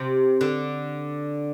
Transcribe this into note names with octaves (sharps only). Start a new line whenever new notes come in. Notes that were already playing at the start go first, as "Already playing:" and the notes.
Already playing: C3
D3